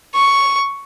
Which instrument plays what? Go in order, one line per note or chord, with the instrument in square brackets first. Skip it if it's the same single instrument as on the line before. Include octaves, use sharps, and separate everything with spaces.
[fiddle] C#6